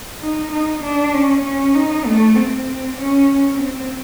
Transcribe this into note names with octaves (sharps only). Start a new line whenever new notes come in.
D#4
D#4
D4
C#4
C#4
D#4
A3
C4
C#4
C4